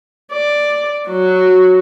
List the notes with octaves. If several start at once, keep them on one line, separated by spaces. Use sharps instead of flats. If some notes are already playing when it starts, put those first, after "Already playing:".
D5
F#3 F#4